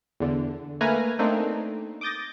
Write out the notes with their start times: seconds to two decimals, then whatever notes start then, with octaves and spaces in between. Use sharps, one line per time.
0.20 E2 D3
0.81 A3 A#3 B4 G#5 A#5 F6
1.19 A3 A#3 C4 D4 D#4
2.01 D6 D#6 G6 A6 A#6